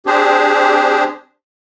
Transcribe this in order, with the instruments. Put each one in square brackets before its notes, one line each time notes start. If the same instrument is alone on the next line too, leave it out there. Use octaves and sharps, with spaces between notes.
[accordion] C4 D4 G4 G#4 C5